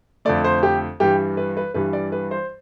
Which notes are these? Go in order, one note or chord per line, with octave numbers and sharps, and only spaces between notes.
F2 D3 A3 D5
C5
G4
G2 E3 G3 G4
B4
B4
G2 E3 G3 B4
D5
B4
C5